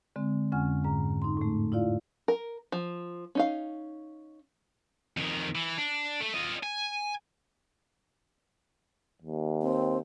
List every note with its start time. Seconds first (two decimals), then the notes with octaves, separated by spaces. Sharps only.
0.16 D3 G#3 C4
0.52 F2 D3 C#4 F#5 G#5 F6
0.84 G#2 D3 A#5
1.22 D#4 C6
1.37 A2 A3
1.72 E4 F4 D5 F5
2.28 A#4
2.72 F3
3.35 C#4 D#4 F5
5.17 F2 D#3
5.55 E3
5.78 D4
6.21 A3
6.35 F4 D#5
6.63 G#5
9.22 D#2
9.62 C4